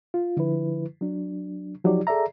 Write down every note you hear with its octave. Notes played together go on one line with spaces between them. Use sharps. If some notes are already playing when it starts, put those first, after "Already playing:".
F4
D3 F3 E4 B4
F#3 D4
F3 F#3 D#4 G4 D5
G#4 A4 D5 E5 A#5